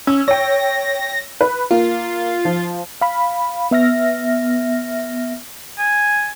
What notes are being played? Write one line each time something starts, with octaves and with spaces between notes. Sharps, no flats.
C#4 E6
C#5 G5 A#6
B4
A#3 F4
F3
F5 B5
B3 E5 F6 A#6
G#5